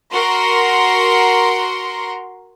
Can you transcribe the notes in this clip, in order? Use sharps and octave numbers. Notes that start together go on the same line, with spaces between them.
F#4 A#4 C6